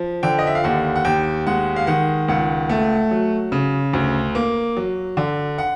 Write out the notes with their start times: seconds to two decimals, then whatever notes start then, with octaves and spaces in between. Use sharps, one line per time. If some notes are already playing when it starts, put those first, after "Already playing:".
Already playing: F3
0.23 D3 G5
0.39 D#5
0.47 E5
0.55 F5
0.64 D#2 F#5
0.96 F#5
1.05 D#2 G5
1.47 G#3 F#5
1.76 F5
1.87 D#3 F#5
2.28 C#2 F#5
2.69 A3
3.11 F#3
3.52 C#3
3.93 D2
4.35 A#3
4.77 F#3
5.17 D3
5.58 F#5